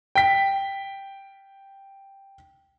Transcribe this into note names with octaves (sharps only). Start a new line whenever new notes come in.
G5 B6